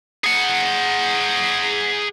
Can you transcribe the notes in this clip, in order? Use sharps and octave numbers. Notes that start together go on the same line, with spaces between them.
G#4 F#5